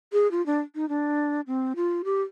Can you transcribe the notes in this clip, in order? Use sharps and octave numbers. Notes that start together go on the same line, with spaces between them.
G#4
F4
D4
D#4
D4
C4
F4
G4